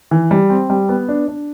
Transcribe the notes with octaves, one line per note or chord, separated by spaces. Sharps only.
E3
G3
C4
G3
B3
D4
D4